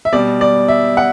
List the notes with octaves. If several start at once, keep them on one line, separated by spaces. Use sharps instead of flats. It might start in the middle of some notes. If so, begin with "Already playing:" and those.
E5
B2 G3 D5
D5
E5
F#5